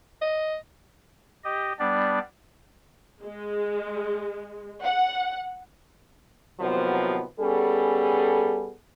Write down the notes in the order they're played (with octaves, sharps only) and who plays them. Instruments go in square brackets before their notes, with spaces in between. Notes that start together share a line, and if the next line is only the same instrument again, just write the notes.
[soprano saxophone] D#5
[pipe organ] G4 D#5
G3 B3 D4 D5
[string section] G#3
F#5
[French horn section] D#2 C3 F3 F#3 B3
G3 B3 C#4 G#4 A4